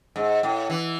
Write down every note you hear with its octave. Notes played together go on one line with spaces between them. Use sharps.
G#2
A2
E3